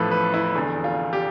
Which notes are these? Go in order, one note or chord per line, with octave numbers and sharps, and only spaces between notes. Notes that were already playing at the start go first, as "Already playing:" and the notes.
Already playing: A1 A2 F3 A4 B4
B4
E4
F1 E2 D3
F4
G4